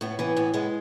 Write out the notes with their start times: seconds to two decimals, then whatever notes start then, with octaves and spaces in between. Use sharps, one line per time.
0.01 A2 B3
0.19 E3 B3
0.36 A2 B3
0.54 G#3 B3